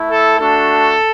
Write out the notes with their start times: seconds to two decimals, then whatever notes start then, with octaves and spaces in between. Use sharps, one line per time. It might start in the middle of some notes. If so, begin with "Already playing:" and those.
Already playing: A3 E4
0.10 A4
0.39 A3 D4 F#4 A4